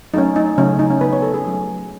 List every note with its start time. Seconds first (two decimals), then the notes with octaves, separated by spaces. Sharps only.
0.14 F#3 A3 C#4 D#4
0.36 D#4
0.58 C#3 F#3 A3 C#4
0.79 D#4
0.91 C#4
1.01 C#3 F#3 B3 B4
1.13 C#5
1.22 A4
1.34 G#4
1.45 F#3 A3 C#4